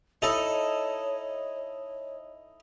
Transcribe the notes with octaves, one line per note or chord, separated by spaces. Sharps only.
D#4 E4 A4 C#5